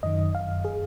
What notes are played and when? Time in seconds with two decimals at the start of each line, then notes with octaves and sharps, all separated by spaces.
0.03 F#2 D#3 D#5
0.35 F5
0.65 G#4